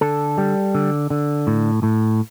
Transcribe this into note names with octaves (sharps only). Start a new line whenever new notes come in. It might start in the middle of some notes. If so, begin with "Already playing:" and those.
D3 A4
G3
D3
D3
A2
A2